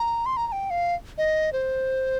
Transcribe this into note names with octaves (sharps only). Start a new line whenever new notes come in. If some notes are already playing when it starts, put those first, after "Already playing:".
Already playing: A#5
C6
A#5
A#5
G5
F5
D#5
C5